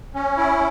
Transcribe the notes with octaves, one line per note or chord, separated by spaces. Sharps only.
C#4
E4